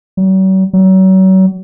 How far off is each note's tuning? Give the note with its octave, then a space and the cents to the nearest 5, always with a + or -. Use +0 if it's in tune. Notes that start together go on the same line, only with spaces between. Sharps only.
F#3 +45
F#3 +35